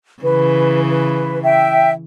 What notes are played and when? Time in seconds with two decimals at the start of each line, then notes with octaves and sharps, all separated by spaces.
0.22 C#3 E3 B4
0.89 B4
1.42 E5 G5